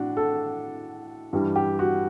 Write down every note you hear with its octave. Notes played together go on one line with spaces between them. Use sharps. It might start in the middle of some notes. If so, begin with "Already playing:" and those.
Already playing: A2 D4 F#4
A4
G2 E3 G3
G4
F#4